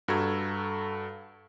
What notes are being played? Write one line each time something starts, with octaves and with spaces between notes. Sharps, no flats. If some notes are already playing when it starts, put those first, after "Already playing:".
G2 F#4 A4 A#5 G#6